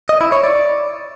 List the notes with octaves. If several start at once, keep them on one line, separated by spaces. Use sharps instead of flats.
D#5
E4
C#5
D5